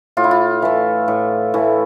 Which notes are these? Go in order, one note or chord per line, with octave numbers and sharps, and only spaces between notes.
A2 F4
E4
F4
E3 A3
A2
E3 A3